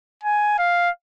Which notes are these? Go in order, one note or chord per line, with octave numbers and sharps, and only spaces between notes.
G#5
F5